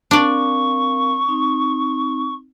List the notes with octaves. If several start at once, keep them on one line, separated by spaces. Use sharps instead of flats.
C4 D4 A#4 D5 F5 C#6
C4 D#4